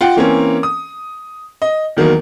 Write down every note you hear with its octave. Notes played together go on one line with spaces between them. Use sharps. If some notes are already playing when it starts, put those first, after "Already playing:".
F4 F#5 G5
E3 A#3 C4 C#4
D#6
D#5
E2 D#3 F#3 A#3